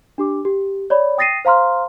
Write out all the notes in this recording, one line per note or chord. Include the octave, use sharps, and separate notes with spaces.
D4 G4 D6
G4
C#5 D5 B5
G5 D#6 A6 A#6 C7 D#7
C5 F5 A#5 C6 F6